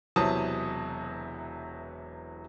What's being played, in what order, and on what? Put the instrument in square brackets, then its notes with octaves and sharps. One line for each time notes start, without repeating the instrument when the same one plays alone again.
[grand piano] E1 C3 E3 F#3 A5 D#6